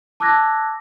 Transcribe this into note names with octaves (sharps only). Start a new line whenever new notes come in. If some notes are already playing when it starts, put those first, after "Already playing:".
A5 D6 E6 F#6 G#6 A#6